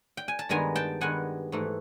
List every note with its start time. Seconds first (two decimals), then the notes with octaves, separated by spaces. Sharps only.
0.17 G5
0.28 G#5
0.39 A5
0.49 G2 D#3 G#3 B3 G#5 A#5
0.76 G5 A5
1.01 G2 D#3 G#3 B3 F#5 G#5
1.52 G#2 E3 A3